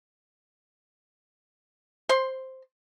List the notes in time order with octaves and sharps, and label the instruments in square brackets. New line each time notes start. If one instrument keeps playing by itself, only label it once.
[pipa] C5 C6